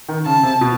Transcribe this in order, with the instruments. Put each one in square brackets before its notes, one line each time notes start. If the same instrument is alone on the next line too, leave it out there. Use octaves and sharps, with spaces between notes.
[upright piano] D#3
[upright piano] C#3 [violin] A5
[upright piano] C3
B2